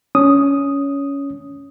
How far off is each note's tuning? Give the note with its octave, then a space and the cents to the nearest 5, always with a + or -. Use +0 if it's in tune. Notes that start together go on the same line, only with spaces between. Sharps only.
C#4 +15 D#6 +0